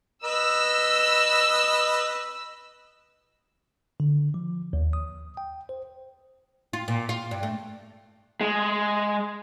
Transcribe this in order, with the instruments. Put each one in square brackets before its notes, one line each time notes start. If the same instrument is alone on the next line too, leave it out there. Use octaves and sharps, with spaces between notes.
[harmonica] B4 D#5 [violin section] E6
[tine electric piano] D3
F3
D#2
D#6
G5
C5
[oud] F4
A#2
F4
G2
A3
[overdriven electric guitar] G#3